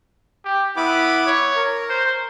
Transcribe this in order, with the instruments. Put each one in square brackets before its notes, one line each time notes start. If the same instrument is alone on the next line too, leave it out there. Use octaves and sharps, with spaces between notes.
[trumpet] G4
[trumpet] B3 [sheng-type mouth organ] E4 B5 D6
[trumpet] C#5
[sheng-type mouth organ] A#4
[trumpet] C5